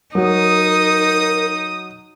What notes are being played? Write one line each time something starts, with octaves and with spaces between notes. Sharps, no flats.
F#3 D#4 F#4 A#4 D#6